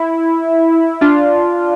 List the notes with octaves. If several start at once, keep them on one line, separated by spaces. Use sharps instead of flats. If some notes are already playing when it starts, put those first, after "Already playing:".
Already playing: E4
D4 F4